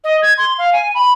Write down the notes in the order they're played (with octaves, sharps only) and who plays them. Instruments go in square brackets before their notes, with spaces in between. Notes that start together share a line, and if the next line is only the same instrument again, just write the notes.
[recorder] D#5
G#6
C6
F5
G#5
B5